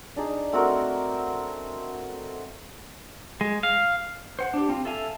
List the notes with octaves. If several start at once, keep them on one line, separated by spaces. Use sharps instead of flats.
D4 D#4 G#4
A3 C4 F#4 A#4
G#3
F5
C5 F#5
D4 G4
C4 F4
A4 E5 F5 G#5